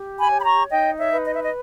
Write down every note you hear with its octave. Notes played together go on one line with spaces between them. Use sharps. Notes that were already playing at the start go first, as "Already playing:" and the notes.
Already playing: G4
G#5 B5
C#5
B5
A#5 C#6
D#4 D#5 G5
C#5 E5
B4
D#5
E5
D#5